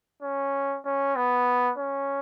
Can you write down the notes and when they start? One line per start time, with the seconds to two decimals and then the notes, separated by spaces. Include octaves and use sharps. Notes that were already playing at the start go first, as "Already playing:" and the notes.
0.22 C#4
0.85 C#4
1.16 B3
1.78 C#4